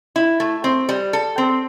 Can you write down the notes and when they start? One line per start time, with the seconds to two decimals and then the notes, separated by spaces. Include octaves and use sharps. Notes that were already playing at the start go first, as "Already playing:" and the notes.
0.16 E4
0.40 A3
0.64 C4
0.89 G3
1.13 A4
1.38 C4